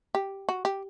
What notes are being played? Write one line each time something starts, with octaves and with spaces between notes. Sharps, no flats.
G4
F#4
G4